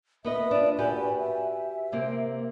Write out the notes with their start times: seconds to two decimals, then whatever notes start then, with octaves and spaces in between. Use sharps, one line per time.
0.25 B3 B4 D#5 E5
0.51 D4 F4
0.78 F#4 G4 B4 G#5
1.18 E5
1.92 C3 A#3 C4